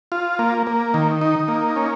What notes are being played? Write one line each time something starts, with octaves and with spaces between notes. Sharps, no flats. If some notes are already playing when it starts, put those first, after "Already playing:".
F4
A#3
A#3
D#3
D#4
A#3
C#4